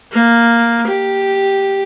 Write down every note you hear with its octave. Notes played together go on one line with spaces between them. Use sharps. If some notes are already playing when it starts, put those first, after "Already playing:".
A#3
G4